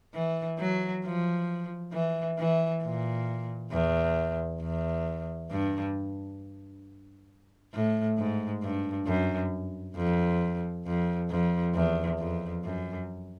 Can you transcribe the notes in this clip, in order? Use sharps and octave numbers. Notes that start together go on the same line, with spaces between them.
E3
F#3
F3
E3
E3
A#2
E2
E2
G2
A2
G#2
G2
F#2
F2
F2
F2
E2
F2
F#2